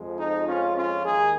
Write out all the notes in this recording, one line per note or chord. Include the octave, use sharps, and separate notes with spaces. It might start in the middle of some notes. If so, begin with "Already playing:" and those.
Already playing: F2 F3 G#3
D#4
C#4 F4
C#4 F4
D#2 D#3 G#3 D#4 G#4